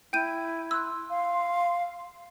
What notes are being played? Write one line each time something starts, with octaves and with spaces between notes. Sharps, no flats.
E4 G5 G6 D#7
C6 E6 F#6
F5